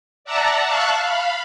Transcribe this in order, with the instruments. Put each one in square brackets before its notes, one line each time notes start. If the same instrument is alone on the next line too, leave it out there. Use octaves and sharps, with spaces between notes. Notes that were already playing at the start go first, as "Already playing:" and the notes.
[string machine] D5 E5 F#5 A5 A#5
E5 F5 A5 C#6 F#6
F5 B5